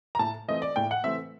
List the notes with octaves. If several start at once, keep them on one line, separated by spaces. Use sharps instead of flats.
A#5
A2 A5
E3 A3 C4 D#5
D5
A2 G5
F#5
E3 A3 C4 E5